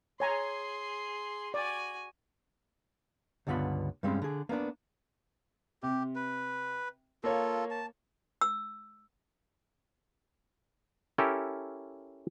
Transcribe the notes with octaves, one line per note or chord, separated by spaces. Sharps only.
G#4 C#5 G#5 A#5 C6
F#4 D5 G#5
C#2 G2 D3 B3 F4 B5
G2 G3 G#3 C4 C#4
D3 G#4
A#3 B3 C#4 D4
C3 G4
B4
A#3 F4 A4 C#5
A5
E6
C#4 E4 G4 A4 A#4